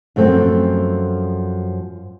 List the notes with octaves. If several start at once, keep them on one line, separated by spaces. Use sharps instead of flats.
F#2 F3 A3 C4